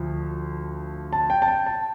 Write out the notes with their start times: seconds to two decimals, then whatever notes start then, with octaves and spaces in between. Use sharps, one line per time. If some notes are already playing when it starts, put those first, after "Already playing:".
Already playing: D2 F3
1.13 A5
1.30 G5
1.42 A5
1.48 G5
1.66 A5